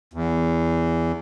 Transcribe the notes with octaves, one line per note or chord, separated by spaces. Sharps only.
E2